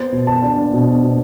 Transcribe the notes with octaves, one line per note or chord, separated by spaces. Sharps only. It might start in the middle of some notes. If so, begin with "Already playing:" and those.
Already playing: B3 C5
B2
A5
D4
B2
B2